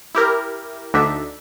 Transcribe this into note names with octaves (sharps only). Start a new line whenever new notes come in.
E4 G4 A#4
D2 D3 D4 D#4 E5